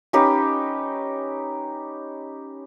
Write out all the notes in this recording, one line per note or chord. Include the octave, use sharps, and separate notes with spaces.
C#4 D#4 G4 B4